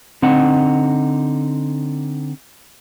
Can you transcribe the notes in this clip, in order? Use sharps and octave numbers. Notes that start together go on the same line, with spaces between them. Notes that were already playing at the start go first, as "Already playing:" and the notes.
D3 C4 D#4 F#5